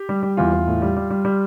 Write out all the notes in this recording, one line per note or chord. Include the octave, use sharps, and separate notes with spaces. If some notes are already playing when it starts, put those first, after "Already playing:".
Already playing: G4
G3
G3
E2 F4
E2
A2
G3
G3
G3
G3